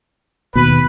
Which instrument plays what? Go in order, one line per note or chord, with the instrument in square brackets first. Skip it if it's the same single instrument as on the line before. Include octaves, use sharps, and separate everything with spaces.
[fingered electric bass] D#2 B2 [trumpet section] B4